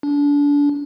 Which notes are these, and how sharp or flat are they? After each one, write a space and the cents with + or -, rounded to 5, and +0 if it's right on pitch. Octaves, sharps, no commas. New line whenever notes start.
D4 -30